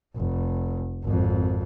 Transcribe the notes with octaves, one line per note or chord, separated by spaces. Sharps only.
F1
G#1 F2